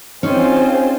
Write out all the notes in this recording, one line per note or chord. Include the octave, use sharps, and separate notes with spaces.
C4 C#4 D#4 F4 G#4 C5